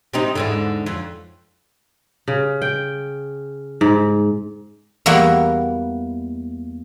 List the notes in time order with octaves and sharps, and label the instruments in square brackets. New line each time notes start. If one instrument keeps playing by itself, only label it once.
[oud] C3 C4 D#4
E2 G#2 D3
F2
[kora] C#3
G5
G#2
[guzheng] E2 G3 A#3 E4 F#4 F#5